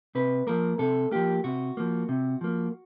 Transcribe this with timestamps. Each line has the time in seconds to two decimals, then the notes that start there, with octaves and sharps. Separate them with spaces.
0.15 C3 B4
0.47 F3 A#3 A#4
0.79 C3 A4
1.11 F3 A#3 G4
1.44 C3 F#4
1.77 F3 A#3
2.09 C3
2.41 F3 A#3